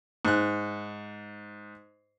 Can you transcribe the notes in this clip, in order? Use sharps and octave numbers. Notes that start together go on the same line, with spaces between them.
G#2 F#6